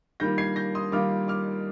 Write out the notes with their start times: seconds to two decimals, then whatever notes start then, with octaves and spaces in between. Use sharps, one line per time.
0.20 D#3 G3 A#3 F4 G6 A#6
0.38 G#6 C7
0.56 G6 A#6
0.75 C6 D#6
0.92 D#3 G3 A#3 F4 D6 F6
1.28 D6 F6